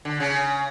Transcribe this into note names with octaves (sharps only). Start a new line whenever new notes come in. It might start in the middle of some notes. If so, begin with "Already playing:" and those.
D3
C#3